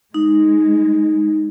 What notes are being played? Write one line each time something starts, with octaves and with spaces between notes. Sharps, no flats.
G#3 D#4